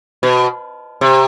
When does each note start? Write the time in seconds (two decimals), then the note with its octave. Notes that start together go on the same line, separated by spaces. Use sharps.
0.23 B2
1.01 C3